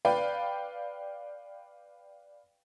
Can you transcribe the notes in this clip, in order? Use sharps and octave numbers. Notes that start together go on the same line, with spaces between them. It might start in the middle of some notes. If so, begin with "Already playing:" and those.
B4 D5 F5 G5